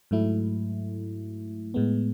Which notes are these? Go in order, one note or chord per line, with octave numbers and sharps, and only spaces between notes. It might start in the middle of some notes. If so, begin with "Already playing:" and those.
G#2 F#3 A3 E4
A2 G#3 B3